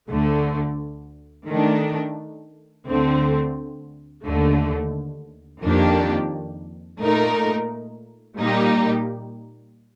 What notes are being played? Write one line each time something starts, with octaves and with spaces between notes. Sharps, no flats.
D2 D3 A3
D#3 A3 D4
D2 D3 A3 C4
D#2 D3 A3
F2 D#3 A#3 D4 G4
A#2 A3 D#4 A#4
A#2 G3 A#3 D#4 G4